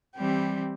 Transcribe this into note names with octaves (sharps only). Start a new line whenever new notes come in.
E3 G3 C4 G4